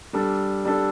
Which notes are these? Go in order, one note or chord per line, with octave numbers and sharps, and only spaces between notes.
G3 D4 A4
G3 D4 A4